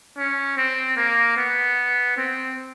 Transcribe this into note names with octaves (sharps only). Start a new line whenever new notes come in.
C#4
C4
A#3
B3
C4